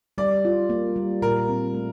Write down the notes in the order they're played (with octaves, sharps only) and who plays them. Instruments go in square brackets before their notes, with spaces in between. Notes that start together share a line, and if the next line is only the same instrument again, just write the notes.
[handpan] G3 [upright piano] D5
[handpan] F4
A#3
G3
[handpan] A#2 [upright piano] A#4
[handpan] C4
A3